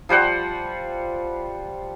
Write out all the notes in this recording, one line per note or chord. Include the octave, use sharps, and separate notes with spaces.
F3 G3 C5 F#5